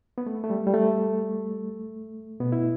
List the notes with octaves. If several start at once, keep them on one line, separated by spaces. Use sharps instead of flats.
B3
A3
A3
G3
G3
A3
B2 B3
E4